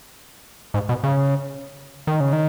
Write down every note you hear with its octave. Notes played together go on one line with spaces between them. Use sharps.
G#2
B2
C#3
D#3
C#3
D#3